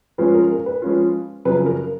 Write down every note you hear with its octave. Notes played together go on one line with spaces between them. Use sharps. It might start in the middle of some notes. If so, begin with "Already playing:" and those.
F3 G#3 C#4 F4 B4
A#4
A#4
B4
F3 G#3 C#4 F4
F#2 C#3 F3 B4
A#4